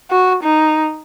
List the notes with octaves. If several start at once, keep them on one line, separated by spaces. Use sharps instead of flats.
F#4
D#4